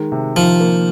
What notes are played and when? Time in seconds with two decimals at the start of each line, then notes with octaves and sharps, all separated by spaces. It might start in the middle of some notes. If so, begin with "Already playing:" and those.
Already playing: D#3 G#3
0.12 C3
0.36 D#3 F3
0.60 A#3